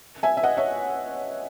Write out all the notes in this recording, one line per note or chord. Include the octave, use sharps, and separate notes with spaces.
E5 G#5
E5
D#5 F#5
C#5 E5